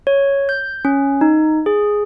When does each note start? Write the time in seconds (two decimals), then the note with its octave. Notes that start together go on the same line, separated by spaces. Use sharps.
0.07 C#5
0.49 G6
0.85 C#4
1.21 D#4
1.66 G#4